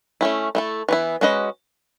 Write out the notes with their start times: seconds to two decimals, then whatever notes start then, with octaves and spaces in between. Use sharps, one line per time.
0.21 A3 C#4 E4
0.55 A3 E4 A4
0.89 E3 B3 E4
1.21 G#3 C#4 F#4 B4 D#5